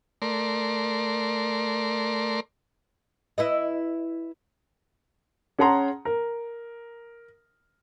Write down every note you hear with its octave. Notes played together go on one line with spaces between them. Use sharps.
A3 A#4 D5 C6
E4 B4 D#5
C#4 G#4 F#5 A5 A#5 C6
A#4